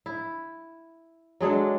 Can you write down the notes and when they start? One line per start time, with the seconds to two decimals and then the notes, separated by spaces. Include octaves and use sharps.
0.06 E4
1.40 F#3 G#3 D4 A4